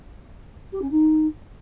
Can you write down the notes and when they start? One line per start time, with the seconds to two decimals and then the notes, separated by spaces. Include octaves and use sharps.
0.73 G4
0.82 C#4
0.91 D#4